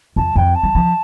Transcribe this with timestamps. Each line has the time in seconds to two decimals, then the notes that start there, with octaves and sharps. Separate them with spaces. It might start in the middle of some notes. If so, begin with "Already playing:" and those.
0.16 F2 A5
0.36 F2 G5
0.55 A5
0.63 G3
0.75 F3